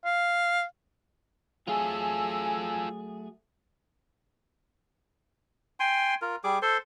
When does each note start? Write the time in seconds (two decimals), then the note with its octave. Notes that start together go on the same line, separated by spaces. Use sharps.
0.05 F5
1.68 F#3 A3 F4 G#4 A4 G#5 E6
5.80 G5 G#5 C6
6.22 F4 A#4
6.44 G3 G#4 D6
6.62 A4 C5 C6